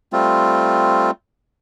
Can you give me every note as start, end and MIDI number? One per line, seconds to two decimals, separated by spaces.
0.13 1.11 55
0.13 1.11 57
0.13 1.11 60
0.13 1.11 65